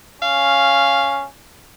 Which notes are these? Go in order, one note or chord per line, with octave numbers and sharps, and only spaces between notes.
C#4 F5